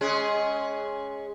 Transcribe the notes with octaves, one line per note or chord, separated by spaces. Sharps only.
G#3 C#4 G#4